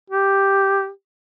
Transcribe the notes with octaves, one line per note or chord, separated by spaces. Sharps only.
G4